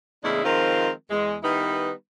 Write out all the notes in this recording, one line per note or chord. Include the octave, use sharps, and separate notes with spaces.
E2 A2 C#3 G#3 D4 E4
D#3 F3 G#3 C4 F4 A#4
E2 G#3
D#3 G3 B3 D#4 E4 B4